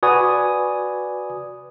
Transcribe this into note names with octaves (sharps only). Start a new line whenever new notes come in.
F#4 B4 D5 G#5 D#6